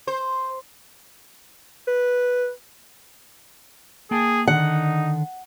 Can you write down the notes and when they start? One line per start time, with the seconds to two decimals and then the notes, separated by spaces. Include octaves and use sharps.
0.07 C5
1.87 B4
4.11 A#3 G#4 G5 A5
4.48 D3 D#3 D4 D#4 F#5